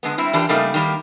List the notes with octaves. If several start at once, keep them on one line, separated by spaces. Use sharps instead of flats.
D3 G#3 B3
G3 C4 E4
E3 D4 F4 G4 A#4
C#3 G3 A3 A#3 D#4
D#3 G3 A#3